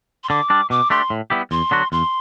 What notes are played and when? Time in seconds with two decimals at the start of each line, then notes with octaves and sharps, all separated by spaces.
0.24 C6
0.29 D3 D6
0.50 G3 D4
0.70 B2 D6
0.90 A3 D4 G4 C6
1.10 A2
1.30 G3 B3 E4 G4
1.51 E2 C6
1.71 D3 F#3 B3 F#4
1.92 E2 C6